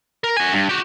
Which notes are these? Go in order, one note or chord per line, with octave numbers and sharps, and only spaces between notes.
A#4
F#4 G#5
G2
F#4 G4